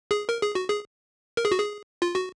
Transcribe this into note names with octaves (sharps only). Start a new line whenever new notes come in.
G#4
A#4
G#4
F#4
G#4
A#4
G#4
F#4
G#4
F4
F#4